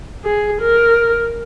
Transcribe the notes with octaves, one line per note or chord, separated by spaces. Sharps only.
G#4
A#4